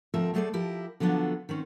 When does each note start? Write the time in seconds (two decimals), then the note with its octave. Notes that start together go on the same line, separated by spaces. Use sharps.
0.14 D2 F3 A3 C4 A#4 E5
0.34 F#3 A3 G#4 A4 C5 D5
0.53 F3 E4 G4 A#4
1.00 D3 F3 F#3 B3 D4
1.49 D#3 C4 C#4